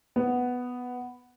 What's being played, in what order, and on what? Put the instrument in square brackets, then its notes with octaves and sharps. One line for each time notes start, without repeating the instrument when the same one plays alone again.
[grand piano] B3